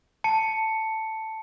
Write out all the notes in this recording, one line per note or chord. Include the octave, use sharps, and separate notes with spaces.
A5 C#7